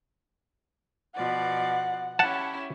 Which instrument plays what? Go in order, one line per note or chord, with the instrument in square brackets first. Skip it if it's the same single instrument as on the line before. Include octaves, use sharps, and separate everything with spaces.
[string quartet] B2 F3 D5 [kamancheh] F#5
[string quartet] C#4 E4 G4 [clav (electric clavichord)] F#5 A5